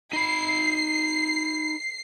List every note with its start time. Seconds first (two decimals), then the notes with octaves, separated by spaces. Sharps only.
0.13 D#4 B5 C7